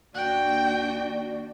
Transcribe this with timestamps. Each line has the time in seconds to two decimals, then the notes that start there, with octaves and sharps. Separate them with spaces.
0.15 D#2 D4 F#4 D5 G5